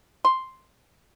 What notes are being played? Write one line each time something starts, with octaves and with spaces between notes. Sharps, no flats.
C6